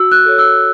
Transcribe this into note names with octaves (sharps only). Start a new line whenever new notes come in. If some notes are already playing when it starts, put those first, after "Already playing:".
Already playing: F#4 E6
F#6
A4 C#5
E6